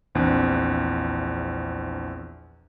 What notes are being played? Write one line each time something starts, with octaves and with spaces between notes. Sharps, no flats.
A#1 E2 C4 D4 F#6